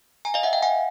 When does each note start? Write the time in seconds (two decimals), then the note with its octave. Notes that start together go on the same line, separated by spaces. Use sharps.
0.25 G#5 A#5
0.34 D#5 F5
0.43 E5 F#5
0.53 F5 G5
0.63 F#5 G#5